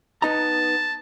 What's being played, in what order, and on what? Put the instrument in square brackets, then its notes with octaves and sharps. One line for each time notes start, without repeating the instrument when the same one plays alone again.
[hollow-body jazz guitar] B3 D#4 A#5 [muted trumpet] A5